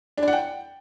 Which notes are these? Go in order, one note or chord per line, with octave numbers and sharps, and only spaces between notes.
D4
D5
F#5
G5